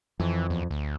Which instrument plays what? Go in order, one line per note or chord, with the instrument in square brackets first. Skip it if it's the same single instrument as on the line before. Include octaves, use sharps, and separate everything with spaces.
[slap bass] F2 [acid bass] E3
[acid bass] E2
D2